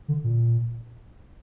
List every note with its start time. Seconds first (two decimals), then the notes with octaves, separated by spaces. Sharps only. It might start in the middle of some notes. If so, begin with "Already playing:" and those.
0.08 D3
0.24 A#2